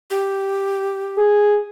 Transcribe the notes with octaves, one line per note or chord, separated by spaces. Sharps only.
G4
G#4